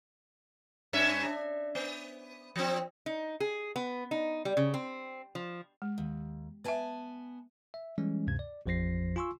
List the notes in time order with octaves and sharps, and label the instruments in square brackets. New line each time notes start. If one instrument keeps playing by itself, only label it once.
[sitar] G2 C#4 E5
D4
B3
F3 C4
[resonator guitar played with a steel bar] D#4
G#4
B3
D#4
G3
C#3
C4
F3
[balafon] G#3
[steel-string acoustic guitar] D#2
[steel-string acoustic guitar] B3 G#5 A5 [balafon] B4 E5
[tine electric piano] E5
E3 G3 G#3 C#4
D2 G2 C3 G#6
D5
A1 F2 F3 C5 A#6 C7
F4 G#5 C6 C#6 E6